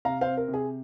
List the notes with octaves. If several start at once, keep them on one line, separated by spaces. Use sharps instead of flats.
C3 F5 A#5
C5 F5
C4
A#4
C3
G#4